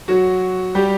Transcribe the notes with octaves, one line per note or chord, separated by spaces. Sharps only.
F#3 F#4
G3 G4